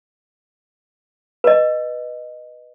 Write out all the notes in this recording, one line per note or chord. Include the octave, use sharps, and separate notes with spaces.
B4 D#5